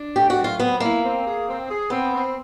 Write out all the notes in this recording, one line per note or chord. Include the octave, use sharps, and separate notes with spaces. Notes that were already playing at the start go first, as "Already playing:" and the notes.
Already playing: D4
A3 G4
F#4
F#3
F4
B3 C4
A#3 E4
C4
G#4
C4
G#4
B3 C4
C4